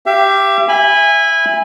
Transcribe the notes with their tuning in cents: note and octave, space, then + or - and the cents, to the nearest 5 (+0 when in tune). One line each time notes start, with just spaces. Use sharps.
G4 +0 E5 +45
E5 +0 G#5 -20 B5 +0